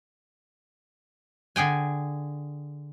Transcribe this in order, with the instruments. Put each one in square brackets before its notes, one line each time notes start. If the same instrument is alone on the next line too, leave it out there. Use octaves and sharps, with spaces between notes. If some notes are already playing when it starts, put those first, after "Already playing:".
[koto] D3 G#4 G5 G#5